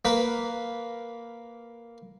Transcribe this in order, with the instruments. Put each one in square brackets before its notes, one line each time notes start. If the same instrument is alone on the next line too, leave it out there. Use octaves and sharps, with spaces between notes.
[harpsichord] A#3 B4